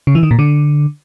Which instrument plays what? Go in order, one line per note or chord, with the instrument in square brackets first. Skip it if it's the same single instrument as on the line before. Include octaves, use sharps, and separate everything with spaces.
[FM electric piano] C#3
E3
D#3
A#2
D3